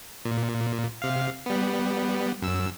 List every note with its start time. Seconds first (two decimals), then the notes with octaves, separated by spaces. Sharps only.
0.25 A#2
1.02 C3 F5
1.46 G3 B3
2.42 F#2 E6